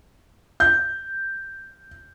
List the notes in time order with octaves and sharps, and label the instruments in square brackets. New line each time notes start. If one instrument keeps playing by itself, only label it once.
[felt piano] G6